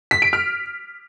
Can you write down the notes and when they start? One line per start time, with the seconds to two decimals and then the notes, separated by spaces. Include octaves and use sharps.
0.11 B6
0.22 D7
0.33 F6